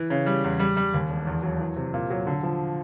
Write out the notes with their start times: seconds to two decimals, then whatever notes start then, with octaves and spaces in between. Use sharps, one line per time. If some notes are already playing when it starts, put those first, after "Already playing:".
Already playing: E3
0.10 C#3
0.26 G3
0.44 E2
0.60 G3
0.77 G3
0.94 D#2
1.10 E1
1.27 E2
1.43 F#3
1.60 E3
1.76 C3
1.94 A#2
2.10 F#3
2.27 D3
2.43 F3